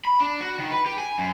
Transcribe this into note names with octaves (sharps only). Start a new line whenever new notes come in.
B5
D4
F#4
D#3
B4
G4
G#5
F#2